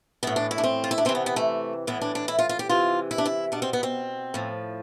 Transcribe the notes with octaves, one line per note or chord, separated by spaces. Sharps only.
A2 E3 B3
D4
E4
D4
C4
F4
E4
D4
C3 E3 C4
B3
B3
A3
A2 E3 B3
D4
D4
E4
F4
F4
G4
C3 E3 F4
E4
D4
E4
B2 D4
C4
B3
C4
A2 F3